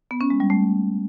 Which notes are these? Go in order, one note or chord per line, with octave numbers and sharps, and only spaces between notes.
B3
C#4
G#3
G3
A3